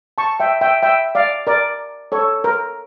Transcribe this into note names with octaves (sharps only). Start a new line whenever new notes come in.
A5 C#6
E5 G5
E5 G5
E5 G5
D5 F5
A#4 D5
A4 C#5
A#4